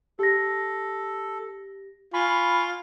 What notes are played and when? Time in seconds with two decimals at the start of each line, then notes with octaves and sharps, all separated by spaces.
0.19 G4 A4 A#6
2.14 F4 G#5 B5 C#6